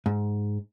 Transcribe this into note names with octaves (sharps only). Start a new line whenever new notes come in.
G#2